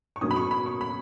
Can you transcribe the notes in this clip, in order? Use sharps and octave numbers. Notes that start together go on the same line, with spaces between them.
C#6
B2 F#3 A#3 C#4 D#6
B5
C#6
B5
C#6
B5